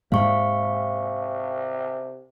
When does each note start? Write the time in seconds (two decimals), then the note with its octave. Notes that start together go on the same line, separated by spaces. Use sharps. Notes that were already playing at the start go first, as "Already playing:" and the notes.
0.12 G#2 C3 G#3 A#3 F5 C#6